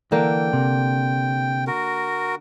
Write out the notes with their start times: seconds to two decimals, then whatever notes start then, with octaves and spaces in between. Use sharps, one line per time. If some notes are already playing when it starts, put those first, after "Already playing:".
0.12 D3 E3 A#3 G5
0.53 C3
1.67 F#4 A#4